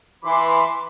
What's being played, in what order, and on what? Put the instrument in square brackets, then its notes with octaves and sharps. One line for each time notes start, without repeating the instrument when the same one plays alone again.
[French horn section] E3 [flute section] B5 C6 D6